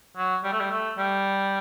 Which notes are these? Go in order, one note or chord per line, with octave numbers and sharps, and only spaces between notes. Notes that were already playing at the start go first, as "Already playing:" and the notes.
F#3
G3
A3
G3
A3
G3